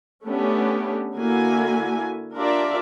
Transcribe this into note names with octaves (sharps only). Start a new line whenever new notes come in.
A3 B3 C#4 D4 G4
D3 A#3 E4 F#4 G#5
D4 F4 G4 A#4 D5 E5